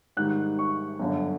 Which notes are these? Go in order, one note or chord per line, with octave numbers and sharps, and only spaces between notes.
G#2 D#3 G3 F#6
C#6
G1 F#2 D3